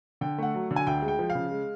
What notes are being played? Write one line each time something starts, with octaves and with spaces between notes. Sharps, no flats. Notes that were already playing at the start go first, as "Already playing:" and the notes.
D3 G5
A3 F#5
F#3
D3
G#5
D2 G5
G#3
G5
F3
F5
C#3
G#3